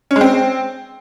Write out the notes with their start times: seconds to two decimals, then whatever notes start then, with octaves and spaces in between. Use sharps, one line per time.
0.11 C#4
0.16 G#3
0.21 C4